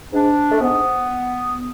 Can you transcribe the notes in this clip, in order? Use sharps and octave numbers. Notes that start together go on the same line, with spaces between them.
G#2 D4
A3
G#2 B3